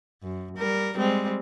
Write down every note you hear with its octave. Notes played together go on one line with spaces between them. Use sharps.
F#2
G3 A#4
G3 G#3 C4